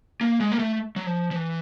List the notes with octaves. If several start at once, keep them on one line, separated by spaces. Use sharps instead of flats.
A#3
G#3
A#3
A3
F#3
F3
F3
E3